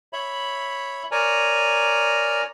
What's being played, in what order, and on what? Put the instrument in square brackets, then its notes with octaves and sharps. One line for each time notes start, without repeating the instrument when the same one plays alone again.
[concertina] C#5 E5 B5
A#4 C#5 D5 G#5 A#5